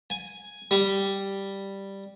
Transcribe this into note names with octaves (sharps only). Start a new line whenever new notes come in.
G#5
G3